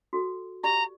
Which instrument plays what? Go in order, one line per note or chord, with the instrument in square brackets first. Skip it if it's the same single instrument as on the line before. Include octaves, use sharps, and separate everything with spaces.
[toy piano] F#4 A4
[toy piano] G4 D5 [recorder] A#5